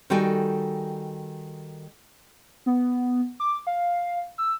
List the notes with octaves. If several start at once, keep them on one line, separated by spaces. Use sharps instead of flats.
D#3 G3 F#4 A4 G5 G#5
B3
D6
F5
E6